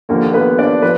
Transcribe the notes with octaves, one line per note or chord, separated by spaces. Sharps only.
D#2 D3 F3 A#3 A#4
B3 B4
D4 D5
F3 B4